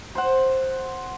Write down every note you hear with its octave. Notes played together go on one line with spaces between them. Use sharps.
C5 F#5